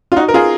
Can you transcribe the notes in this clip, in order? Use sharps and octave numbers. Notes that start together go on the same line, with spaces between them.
F4
D#4 F#4
A#4
F4 G#4